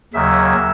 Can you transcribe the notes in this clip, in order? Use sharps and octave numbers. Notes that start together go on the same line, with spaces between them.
D#2 C#3 F#3 E5